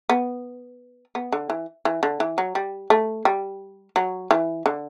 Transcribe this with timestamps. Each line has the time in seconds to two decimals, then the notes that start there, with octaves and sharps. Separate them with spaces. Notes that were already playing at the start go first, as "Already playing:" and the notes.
0.09 B3
1.15 B3
1.32 D3
1.50 E3
1.85 E3
2.03 D3
2.20 E3
2.38 F#3
2.55 G3
2.90 A3
3.25 G3
3.96 F#3
4.31 E3
4.66 D3